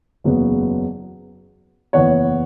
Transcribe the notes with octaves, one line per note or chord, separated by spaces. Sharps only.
F#1 E2 C#3 F#3 B3
F#1 E2 E3 B3 C#5 F#5